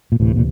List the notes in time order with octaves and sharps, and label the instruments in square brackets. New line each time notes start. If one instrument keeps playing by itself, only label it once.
[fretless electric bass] A#2
[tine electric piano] D2 C3 E3 [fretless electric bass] A2
[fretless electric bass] A#2